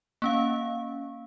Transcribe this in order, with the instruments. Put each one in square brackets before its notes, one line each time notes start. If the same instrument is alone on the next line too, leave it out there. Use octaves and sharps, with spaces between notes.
[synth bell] A#3 C#4 F5